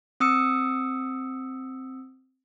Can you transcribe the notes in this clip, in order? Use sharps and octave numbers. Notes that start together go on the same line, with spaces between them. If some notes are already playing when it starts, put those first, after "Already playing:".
C4 D#6 E6 C#7